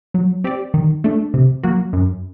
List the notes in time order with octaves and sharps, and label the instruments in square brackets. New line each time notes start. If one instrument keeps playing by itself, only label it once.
[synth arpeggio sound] F#3
C4 G4 D5
D#3
A3 D4
C3
F#3 A#3 F#4
F#2